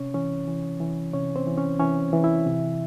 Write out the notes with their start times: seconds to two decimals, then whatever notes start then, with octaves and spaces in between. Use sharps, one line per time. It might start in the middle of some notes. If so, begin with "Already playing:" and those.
Already playing: C3 C#4 C#5
0.14 E3 C#4 C#5
0.47 E3
0.80 E3
1.13 C3 C#4 C#5
1.36 C4 C5
1.47 E3
1.58 C#4 C#5
1.80 E3 C#4 C#5
2.13 E3
2.24 E4 E5
2.46 C3